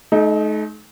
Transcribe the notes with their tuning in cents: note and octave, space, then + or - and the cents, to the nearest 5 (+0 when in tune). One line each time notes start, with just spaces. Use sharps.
A3 -45 D#4 +0